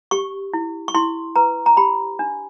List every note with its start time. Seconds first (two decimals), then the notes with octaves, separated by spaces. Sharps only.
0.11 G4 C#6
0.53 E4
0.88 C#6
0.95 E4 C6
1.36 B4 A#5
1.66 A#5
1.77 G4 B5
2.19 D4